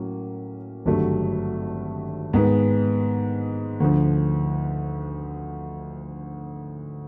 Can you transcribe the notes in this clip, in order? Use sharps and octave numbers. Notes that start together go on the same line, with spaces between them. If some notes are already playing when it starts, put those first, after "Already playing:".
Already playing: A2 F#3 A#3 C#4
G#1 G2 D3 F#3 A3
G#2 D#3 G#3 B3
D2 D3 F3